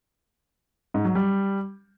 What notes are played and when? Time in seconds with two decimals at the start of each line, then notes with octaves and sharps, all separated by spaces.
0.94 G#2
1.05 F#3
1.15 G3